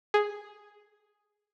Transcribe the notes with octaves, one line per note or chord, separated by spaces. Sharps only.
G#4